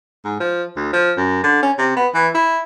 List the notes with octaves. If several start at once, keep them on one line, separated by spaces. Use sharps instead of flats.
G#2
F3
D2
F3
F#2
D3
C#4
C3
B3
E3
E4